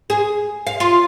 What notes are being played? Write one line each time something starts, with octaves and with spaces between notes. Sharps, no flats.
G#4
F5
F4